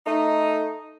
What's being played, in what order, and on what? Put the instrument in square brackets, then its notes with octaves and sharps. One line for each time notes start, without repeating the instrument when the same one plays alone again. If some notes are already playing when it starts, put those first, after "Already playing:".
[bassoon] A3 [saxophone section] D#4